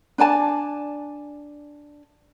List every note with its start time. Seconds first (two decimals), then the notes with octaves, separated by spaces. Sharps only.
0.18 D4 D5 G#5 A5